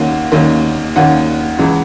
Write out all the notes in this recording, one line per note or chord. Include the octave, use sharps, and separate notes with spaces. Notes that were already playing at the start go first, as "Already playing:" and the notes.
Already playing: D#2 D#3 A#3 C#4 F#5
D#2 D#3 A#3 C#4
D#2 D#3 A#3 C#4 F#5
C#2 C#3 E3